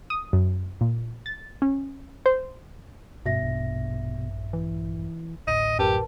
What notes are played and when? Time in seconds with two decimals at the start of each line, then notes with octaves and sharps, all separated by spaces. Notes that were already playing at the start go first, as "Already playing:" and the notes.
0.10 D#6
0.33 F#2
0.81 A#2
1.26 A6
1.62 C#4
2.26 C5
3.26 G1 G2 B2 C#4 E5 A#6
3.41 A#1 G2 D4
4.53 E3
5.47 A1 D2 A2 D#5
5.79 F#2 G4 A#4 B4 A5